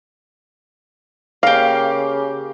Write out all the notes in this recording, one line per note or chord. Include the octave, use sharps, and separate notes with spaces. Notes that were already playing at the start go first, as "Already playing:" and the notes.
C#3 A#3 G4 F5